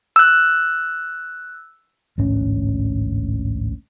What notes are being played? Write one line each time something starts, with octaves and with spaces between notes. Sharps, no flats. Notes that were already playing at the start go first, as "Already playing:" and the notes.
E6 F#6
A1 D2 G#2 C#4